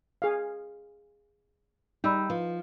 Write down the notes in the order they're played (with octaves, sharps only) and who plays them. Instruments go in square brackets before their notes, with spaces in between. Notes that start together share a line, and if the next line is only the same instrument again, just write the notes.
[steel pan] G#4 F5
[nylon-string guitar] G3 [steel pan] D#4 [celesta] B5 E6 G6
[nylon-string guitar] F3 [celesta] B4